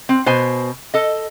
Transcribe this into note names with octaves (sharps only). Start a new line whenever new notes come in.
C4
B2 C5 G#5
A4 D#5